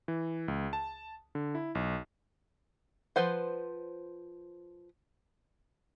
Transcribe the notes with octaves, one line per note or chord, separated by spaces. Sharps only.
E3
C#2
A5
D3
E4
B1
F3 B4 C5 F#5